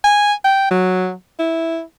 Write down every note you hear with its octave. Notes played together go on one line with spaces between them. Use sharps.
G#5
G5
F#3
E4